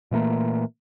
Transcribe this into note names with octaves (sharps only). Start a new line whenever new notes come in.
A#2 E3 A3 A#3